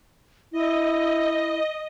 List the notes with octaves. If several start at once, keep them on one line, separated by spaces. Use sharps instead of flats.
E4 D#5